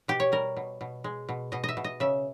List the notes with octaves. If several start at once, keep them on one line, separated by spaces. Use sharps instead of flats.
B2 G4
C#5
G3 A#4
B2
B2
G#3
B2
B2 D#5
D#5 E5
B2
D#5
C#3 E5